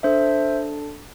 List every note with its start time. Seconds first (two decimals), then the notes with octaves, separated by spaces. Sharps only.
0.03 D4 A4 C5 E5